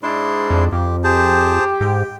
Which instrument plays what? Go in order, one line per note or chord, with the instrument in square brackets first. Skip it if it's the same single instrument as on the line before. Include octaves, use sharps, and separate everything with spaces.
[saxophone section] G#2 D4 [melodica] E4 C6
[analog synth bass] F2
[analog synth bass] F2 [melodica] G4
[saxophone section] G4 [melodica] G#4 C5 A5
[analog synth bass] G#2 [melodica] G5